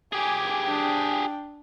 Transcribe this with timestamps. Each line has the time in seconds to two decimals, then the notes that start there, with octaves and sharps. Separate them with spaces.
0.13 G4 G#4 G#5 D6
0.64 D4 G5